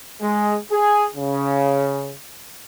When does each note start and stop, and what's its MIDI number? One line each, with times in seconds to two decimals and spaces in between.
0.21 0.57 56
0.72 1.06 68
1.16 2.13 49